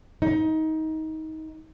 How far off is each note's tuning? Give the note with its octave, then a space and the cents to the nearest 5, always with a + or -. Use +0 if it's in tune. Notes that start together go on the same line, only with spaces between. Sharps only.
D#4 +20